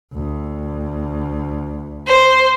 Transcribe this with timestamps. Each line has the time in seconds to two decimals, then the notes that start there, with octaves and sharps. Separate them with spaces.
0.14 D2
2.07 C5